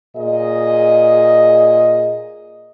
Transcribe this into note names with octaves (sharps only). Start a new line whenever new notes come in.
A#2 G#4 D#5